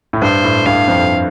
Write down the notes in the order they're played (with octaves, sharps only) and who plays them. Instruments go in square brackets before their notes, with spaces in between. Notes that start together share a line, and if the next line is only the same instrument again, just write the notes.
[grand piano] A2
[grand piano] G2 [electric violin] C5
[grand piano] A2
[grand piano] G2 [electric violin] F5
[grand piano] F2